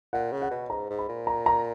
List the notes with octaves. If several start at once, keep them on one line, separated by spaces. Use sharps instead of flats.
A#2 F#5
C#3
F#5
B2
G#2 A#5
G#2
B5
A#2
A#5
A#5